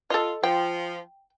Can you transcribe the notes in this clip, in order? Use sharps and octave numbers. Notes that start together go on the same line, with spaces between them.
F4 A4 D#5
F3 G5